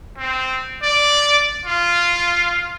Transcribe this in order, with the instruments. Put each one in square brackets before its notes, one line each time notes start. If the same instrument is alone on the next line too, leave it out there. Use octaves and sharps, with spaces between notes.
[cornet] C4
D5
F4